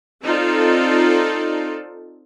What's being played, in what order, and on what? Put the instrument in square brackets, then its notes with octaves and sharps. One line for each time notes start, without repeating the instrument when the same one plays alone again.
[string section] C4 D#4 F4 A4 D5